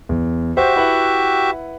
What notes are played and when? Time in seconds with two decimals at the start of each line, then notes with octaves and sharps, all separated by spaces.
0.09 E2
0.57 F#4 G4 C5 E5
0.76 E4 B4 F#5